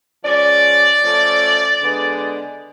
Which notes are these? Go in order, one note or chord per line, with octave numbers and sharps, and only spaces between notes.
F3 G#3 C#4 D5
F3 A3 C#4
D3 G#3 B3